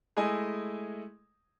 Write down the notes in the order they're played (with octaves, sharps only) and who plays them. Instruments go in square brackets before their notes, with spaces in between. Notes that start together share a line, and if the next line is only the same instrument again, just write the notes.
[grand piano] G#3 A3 E4 D#5 G#5